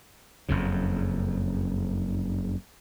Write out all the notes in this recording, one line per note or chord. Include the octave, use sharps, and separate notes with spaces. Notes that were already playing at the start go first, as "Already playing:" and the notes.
F#1 F2 C#3